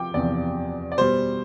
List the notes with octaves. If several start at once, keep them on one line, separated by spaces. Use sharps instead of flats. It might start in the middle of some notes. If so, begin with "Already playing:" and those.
Already playing: C3 F3 G5 D6
E2 C3 F3 D5
D5
B2 G3 C5